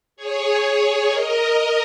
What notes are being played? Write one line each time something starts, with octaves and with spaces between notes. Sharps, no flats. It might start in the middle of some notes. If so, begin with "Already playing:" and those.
G#4 C#5
A#4 D#5